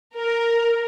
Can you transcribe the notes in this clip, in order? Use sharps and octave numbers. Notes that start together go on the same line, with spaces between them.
A#4